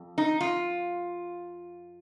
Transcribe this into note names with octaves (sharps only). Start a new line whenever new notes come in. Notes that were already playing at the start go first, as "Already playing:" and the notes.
Already playing: F2
D#4
F4